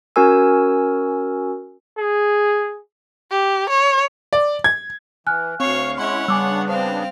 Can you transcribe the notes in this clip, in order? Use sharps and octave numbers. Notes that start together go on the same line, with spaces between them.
C#4 F#4 A#4 G#5 E6
G#4
G4
C#5
D5
G#6
E3 G#5 F6 F#6
D2 C4 C#5 F5 C#6
G#3 C#4 E4 C#5 F#5 C6
C#3 G3 B3 D4 G#5 D6 E6
C4 C5 F5